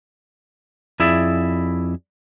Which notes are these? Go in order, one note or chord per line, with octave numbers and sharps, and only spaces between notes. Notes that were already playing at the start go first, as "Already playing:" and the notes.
F2 E4 G#4 D5 E5